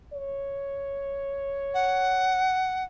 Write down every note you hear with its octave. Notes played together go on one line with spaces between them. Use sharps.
C#5
F#5